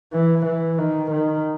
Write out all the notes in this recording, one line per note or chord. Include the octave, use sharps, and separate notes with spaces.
E3
E3
D#3
D#3